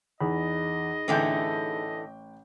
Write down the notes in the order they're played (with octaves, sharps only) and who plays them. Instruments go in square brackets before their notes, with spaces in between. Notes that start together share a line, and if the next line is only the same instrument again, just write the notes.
[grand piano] E2 [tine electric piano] D#4 G#4 B5 [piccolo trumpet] D#5
[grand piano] A1 G5 G6 [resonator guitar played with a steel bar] D3 E3 A3